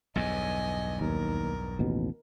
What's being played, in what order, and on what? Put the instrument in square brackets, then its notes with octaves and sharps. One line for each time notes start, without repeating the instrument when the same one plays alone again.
[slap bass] B1 E2 G2 [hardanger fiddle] D#5 G#5
[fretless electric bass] D#2 [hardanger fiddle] A#4
[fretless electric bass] A1 D#2 B2